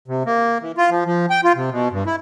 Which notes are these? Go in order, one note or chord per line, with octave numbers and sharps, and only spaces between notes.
C3
A#3
E3
F4
F3
F3
G5
F4
C3
B2
G2
E4